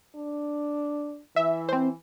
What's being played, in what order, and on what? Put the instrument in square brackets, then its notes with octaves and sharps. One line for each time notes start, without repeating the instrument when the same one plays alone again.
[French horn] D4
[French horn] E3 [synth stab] E5
[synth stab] C4 C5